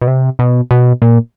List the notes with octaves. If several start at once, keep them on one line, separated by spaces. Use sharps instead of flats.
B2
C3
B2
B2
A#2